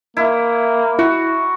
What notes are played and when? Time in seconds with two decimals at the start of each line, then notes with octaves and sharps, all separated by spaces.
0.17 A#3 E4
0.99 E4 F#4